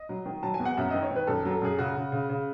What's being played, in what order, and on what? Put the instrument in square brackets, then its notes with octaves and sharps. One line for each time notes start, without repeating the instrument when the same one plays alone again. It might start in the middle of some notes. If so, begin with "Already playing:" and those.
Already playing: [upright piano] D#5
F#3
D#3
F#3 A5
G#5
E2
F#5
F#2 E5
D#3 D#5
C#5
D#3
B4
F#2 A4
F#3
A4
F#2 G#4
C#3 F#4
C#3
C#3
C#3